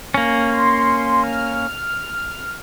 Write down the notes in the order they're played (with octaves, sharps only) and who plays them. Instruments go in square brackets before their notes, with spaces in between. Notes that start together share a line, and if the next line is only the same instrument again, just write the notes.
[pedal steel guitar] A#3 C#4
[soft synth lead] C6
F6